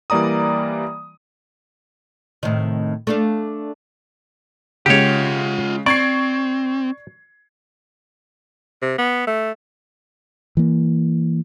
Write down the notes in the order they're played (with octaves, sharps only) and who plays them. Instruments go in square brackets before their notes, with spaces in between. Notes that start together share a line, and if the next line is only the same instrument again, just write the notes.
[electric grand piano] E3 G3 A#3 D5 A#5 D#6
[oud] A2 C3 D#3
A3 D4 F5
[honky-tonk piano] C#3 G#3 [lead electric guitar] F4 F#5 [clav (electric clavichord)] G4 C#5
[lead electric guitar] C4 [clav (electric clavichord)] D5 [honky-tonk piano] C#6 G#6 C7
[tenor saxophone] C3
B3
A3
[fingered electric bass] E3 A#3